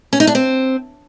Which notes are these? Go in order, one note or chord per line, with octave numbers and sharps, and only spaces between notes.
C#4
D#4
D4
C4